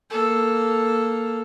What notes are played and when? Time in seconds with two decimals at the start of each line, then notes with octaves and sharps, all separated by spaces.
0.10 A#3 A4